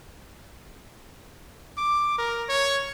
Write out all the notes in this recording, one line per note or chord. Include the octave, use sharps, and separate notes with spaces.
D6
A#4
C#5